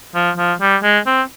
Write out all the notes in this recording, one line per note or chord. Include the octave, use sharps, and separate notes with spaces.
F3
F3
G3
G#3
C4